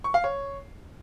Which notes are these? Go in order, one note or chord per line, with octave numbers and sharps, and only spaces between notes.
C#6
F5
C#5